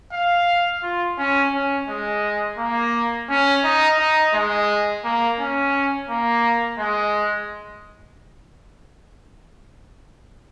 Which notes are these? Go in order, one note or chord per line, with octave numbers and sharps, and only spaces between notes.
F5
F4
C#4
C#4
G#3
A#3
C#4
D#4
D#4
G#3
A#3
C#4
A#3
G#3